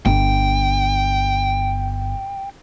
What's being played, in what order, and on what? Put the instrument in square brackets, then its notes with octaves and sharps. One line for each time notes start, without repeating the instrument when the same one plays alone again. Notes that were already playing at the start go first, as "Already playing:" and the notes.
[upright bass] G1 [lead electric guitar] G5